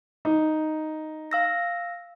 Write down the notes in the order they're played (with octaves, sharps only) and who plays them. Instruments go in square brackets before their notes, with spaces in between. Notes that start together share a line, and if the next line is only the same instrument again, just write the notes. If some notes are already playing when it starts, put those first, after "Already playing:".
[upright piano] D#4
[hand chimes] F5 E6 A#6